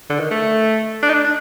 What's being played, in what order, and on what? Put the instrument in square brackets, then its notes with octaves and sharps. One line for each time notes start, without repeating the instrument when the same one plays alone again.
[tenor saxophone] D3
D#3
A3
D4
D#4
D4
D4